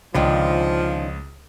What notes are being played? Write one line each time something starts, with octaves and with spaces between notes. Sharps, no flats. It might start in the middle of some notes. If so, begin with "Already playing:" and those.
C#2 D3 D#3 F3 C#4